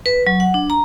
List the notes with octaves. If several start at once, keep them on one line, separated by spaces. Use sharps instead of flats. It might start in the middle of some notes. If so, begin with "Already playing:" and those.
B4
F#3
F#5
D4
A#5